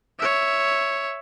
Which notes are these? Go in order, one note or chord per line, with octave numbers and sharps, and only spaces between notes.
C#5 E5